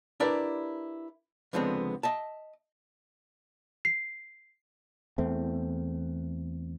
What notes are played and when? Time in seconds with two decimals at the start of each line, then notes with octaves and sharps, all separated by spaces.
0.20 D4 E4 G4 A#4 B4 D5
1.53 C#2 D3 F3 G#3 B3 C4
2.03 D#5 E5 A5
3.85 C7
5.18 E2 A3 C4